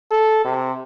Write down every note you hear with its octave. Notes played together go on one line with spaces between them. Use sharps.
A4
C3